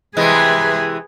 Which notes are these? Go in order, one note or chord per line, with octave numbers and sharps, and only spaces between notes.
C3 E3 G#3 G#4 B4